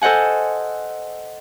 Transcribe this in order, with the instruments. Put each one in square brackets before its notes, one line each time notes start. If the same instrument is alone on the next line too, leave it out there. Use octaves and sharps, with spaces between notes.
[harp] A4 C5 D#5 F#5 G#5